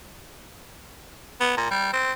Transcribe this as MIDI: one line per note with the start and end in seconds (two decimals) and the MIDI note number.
1.41 1.53 59
1.57 1.67 46
1.71 1.91 55
1.93 2.12 60